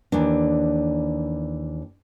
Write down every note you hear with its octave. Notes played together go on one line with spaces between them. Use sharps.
D#2 E3 D4